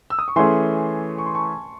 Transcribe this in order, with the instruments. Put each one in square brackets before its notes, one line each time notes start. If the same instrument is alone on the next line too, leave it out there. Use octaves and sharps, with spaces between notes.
[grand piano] E6
D#6
C#6
[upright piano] E3 A3 C#4 G#4 [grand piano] G#5 C6
[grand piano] C#6
C6
A5 C#6